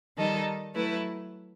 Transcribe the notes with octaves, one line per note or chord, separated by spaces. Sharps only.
D#3 G3 D#4 A4 D#5
F#3 A3 E4 B4